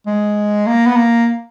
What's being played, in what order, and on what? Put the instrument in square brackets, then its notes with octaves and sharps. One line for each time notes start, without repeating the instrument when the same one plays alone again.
[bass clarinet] G#3
A#3
B3
A#3